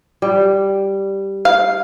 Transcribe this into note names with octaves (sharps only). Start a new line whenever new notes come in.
G3
F5